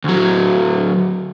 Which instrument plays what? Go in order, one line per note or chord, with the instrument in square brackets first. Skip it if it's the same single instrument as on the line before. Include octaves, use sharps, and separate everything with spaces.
[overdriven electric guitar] D2 F#3